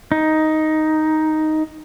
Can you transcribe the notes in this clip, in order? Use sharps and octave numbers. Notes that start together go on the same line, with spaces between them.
D#4